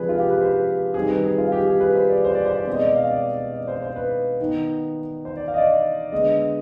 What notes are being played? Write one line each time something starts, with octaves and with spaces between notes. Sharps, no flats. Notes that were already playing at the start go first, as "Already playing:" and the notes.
Already playing: C3 F3 G#3 G#4 B4 D5
F4
G4
B4
C5
B4
D#3 G3 C4 G#4
B4
G#4
F4
G4
G#4
B4
C5
D5
C5
D5
C5
D5
B2 G#3 C4 C5
D#5
D5
F5
D5
D5
C5
C5
B4
D#3 B3
C5
D5
F5
D#5
D5
D3 G#3 B3 D#5